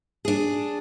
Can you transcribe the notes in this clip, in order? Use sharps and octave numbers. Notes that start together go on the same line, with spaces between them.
D4 G#4